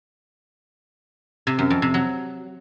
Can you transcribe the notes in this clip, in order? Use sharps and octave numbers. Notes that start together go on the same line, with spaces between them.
C3
F#2
F2
C3
F#3